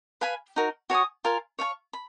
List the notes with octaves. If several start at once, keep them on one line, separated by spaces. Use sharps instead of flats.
B4 F5 G#5 B5
D#4 F#4 A#4
F#4 C#5 G#5 D#6
F4 A#4 F5 G#5
C#5 F5 G#5 C#6
B5